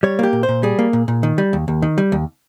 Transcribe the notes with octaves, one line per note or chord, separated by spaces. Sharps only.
G3 C#5
A#3 G4
A#2
C5
A#2
G3 G#4
A#3
A#2
A#2
D#3
G3
D#2
D#2
D#3
G3
D#2